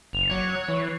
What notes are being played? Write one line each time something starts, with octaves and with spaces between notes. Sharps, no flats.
F#1 F7
F#3 C#5 D6
F#6
E3 C#6
C7